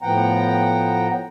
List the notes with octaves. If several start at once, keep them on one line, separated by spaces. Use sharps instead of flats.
A2 F3 B3 F#5 G5 A#5